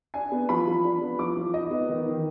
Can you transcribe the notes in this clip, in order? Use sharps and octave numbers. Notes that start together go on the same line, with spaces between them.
D4 G#5
B3
F3 B5
F3
D4
B3
F3 D6
F3
D#4 D#5
B3
D#3
D#3